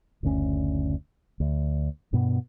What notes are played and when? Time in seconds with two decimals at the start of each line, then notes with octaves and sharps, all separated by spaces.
0.23 F#1 D2 C#4
1.40 D2
2.13 G2 B2 B3